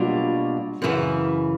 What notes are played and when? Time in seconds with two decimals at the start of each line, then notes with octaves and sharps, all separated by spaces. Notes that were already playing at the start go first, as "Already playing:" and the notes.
Already playing: B2 F#3 G3 A#3 D4 F4
0.82 F#2 C#3 E3